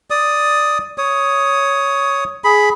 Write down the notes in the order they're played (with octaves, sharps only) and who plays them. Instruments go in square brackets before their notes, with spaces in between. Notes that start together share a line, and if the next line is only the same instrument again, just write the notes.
[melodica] D5 D#6
C#5 D#6
G#4 B5